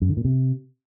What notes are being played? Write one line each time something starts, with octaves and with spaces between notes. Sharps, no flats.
F#2
D3
A#2
C3